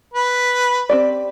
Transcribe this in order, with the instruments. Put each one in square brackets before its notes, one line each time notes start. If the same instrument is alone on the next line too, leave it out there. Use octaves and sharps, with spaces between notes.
[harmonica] B4
[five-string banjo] C4 G4 D5